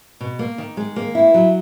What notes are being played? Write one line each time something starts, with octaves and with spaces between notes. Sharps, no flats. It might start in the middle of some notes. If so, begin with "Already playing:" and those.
B2
A#3
D#3
G#3
A#3
E4
F#3